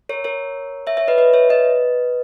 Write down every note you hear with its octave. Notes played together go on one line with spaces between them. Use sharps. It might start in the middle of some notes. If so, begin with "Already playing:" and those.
A#4 C#5
A#4 C#5
C#5 E5
C#5 E5
B4 D#5
B4 D#5
C#5 E5
B4 D#5